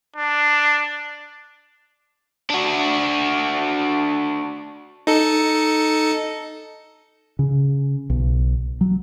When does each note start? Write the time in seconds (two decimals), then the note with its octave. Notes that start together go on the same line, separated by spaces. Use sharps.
0.16 D4
2.50 D4 F#4
5.07 D#4 A4 C#7
7.39 C#3
8.10 B1
8.81 F#3